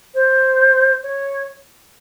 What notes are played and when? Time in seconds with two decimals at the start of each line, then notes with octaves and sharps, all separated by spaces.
0.14 C5
1.03 C#5